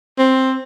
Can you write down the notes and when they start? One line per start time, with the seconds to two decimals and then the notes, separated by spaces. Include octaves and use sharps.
0.18 C4